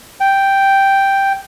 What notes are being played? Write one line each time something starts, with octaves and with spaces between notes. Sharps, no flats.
G5